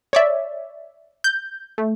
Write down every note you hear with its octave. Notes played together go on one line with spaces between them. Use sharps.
C#5 D5 E5
G6
A3